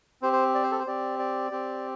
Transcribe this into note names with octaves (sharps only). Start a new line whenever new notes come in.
C4 G4 C5
C5
D5
C5
A4
C5
C4 G4 D5
D5
C4 G4